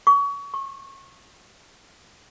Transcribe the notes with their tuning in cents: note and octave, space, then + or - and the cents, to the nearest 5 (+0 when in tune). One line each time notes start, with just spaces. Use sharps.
C#6 +30
C#6 -30